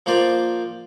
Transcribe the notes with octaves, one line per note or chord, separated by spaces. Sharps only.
F3 A#3 C5 D5